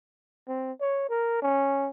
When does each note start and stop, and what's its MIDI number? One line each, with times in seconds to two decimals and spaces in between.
0.48 0.72 60
0.81 1.07 73
1.10 1.38 70
1.42 1.90 61